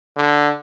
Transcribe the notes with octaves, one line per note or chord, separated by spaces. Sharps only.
D3